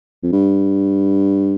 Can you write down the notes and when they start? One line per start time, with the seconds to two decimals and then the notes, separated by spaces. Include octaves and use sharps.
0.23 F2
0.32 G2